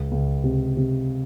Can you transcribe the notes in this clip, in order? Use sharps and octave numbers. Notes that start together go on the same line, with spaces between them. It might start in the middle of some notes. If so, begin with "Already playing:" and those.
Already playing: C#2
C#2
C3
C3